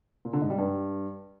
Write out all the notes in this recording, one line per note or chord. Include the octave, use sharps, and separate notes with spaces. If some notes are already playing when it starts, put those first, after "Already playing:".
A#2
D3
G#2
G3
G2